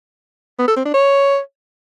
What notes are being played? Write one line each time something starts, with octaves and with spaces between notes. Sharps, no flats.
B3
A4
C4
D4
C#5